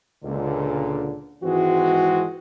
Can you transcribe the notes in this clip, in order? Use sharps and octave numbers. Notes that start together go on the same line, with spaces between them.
C#2 A#2 D3
G#1 E3 G#3 C4 F#4